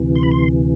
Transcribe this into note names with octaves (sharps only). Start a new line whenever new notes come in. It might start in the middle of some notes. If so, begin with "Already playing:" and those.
Already playing: D2 C3 E3
C6
B5
C6